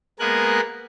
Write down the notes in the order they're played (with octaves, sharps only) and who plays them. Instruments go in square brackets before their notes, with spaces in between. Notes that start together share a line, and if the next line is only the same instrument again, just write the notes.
[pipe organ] G#3 A#3 B3 A#4 G#5 F#6